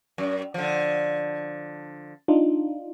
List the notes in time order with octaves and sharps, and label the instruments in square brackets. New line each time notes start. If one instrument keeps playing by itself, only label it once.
[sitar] F#2
D3 F3
[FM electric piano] D4 D#4 F4